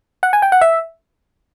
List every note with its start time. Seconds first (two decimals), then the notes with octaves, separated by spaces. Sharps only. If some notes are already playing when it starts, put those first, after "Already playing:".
0.23 F#5
0.33 G#5
0.42 G5
0.52 F#5
0.61 E5